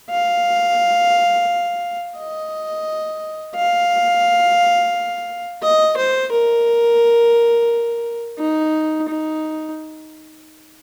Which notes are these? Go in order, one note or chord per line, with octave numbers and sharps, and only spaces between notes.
F5
D#5
F5
D#5
C5
A#4
D#4
D#4